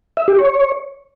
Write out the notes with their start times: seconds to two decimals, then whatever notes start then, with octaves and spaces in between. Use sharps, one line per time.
0.17 E5
0.28 G4
0.38 C#5